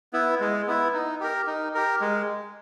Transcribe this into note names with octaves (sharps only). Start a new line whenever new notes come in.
B3 E4
G#3
B3 E4
D#4
G4 A#4
D#4
G4 A#4
G#3